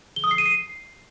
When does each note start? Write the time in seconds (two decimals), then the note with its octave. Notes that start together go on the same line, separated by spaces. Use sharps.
0.16 G7
0.24 D#6
0.31 C7
0.38 D#7
0.46 C7